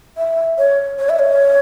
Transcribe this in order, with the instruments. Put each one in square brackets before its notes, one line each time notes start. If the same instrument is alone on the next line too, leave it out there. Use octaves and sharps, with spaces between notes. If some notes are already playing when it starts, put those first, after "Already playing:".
[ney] E5
C#5
C#5
E5
C#5